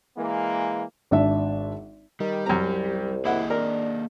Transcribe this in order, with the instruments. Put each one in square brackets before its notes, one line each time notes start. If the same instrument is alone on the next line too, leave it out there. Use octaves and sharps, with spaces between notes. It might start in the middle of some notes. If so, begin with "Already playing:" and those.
[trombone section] E3 G#3 A#3
[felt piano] G#1 D4 E5
[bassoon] D#3 [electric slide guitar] G3
[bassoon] C2 [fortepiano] F#2 A#5
[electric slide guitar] A#3 G#4 D#5 [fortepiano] E4 F#5
[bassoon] D4 [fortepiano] A#4